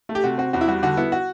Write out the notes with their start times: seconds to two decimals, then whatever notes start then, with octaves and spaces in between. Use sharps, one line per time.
0.09 A3
0.15 G4
0.24 C3 F#4
0.38 C4 F#4
0.53 E2 F#4
0.61 E4
0.68 G3 F#4
0.83 D3 F#4
0.97 B3 E4
1.12 F#4